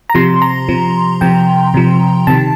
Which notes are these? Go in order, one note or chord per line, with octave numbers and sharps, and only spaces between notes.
A#5
C3 F3 C6
A#5
C3 F3
C3 F3 G5
C3 F3
C3 D#3 A5